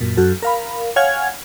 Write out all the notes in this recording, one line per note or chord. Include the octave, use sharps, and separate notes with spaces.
F#2 A#2
F#2 F#4 A4
A#4 F5 B5
C#5 F5 F#5 G#5 F6 G#6